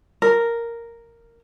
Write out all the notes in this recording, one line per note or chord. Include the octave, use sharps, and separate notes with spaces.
A#4